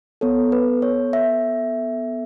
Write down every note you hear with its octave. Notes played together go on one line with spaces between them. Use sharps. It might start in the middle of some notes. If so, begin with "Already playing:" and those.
B3 A4 C#5
B4
C#5
E5